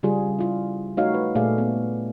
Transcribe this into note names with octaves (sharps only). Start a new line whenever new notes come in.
C#3 G3 F4 G#4
E4 F4
A3 D#4 F#4 C#5 F5
B4
A#2 A3 G#4 D5 F5
B3